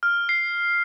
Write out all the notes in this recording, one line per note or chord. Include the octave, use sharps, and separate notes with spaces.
F6
C7